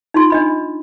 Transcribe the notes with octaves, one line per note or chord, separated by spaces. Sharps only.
D#4 F4 C6
D4 D#5 B5